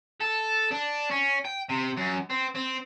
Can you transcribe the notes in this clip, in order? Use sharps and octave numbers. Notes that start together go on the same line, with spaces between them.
A4
D4
C#4
G5
C3
F#2
C4
C4